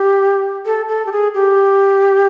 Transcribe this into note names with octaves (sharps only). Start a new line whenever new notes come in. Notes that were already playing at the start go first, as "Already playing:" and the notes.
Already playing: G4
A4
A4
G4
G#4
G4